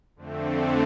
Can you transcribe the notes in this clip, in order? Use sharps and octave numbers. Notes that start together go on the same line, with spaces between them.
F2 D3 A3 C4